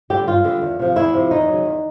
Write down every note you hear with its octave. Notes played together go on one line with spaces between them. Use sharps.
D3 G3 G4
G2 F4
D3 G3
E2
C3 F3
E2 E4
C3 F3
E2 D#4
C#3 F#3
E2